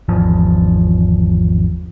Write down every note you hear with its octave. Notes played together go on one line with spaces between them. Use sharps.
G#1 E2 F3